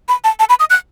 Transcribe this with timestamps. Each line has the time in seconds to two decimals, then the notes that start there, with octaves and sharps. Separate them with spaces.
0.08 B5
0.24 A5
0.39 A5
0.49 B5
0.60 D#6
0.70 F#6